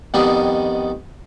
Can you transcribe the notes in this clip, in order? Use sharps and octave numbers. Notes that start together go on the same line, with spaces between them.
F2 D#3 G3 B3 D#4